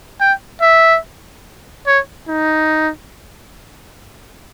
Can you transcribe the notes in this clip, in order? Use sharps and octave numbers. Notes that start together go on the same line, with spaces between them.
G5
E5
C#5
D#4